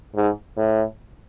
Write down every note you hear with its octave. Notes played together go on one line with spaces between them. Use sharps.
G#2
A2